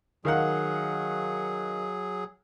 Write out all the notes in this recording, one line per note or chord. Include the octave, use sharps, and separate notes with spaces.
D#3 F#3 G#4 F5 F#5